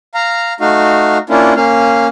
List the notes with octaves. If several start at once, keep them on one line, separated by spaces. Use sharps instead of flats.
F5 A#5
A3 D#4 F#4 F5
A#3 C#4 D4 E4 F4
A#3 C#4 F5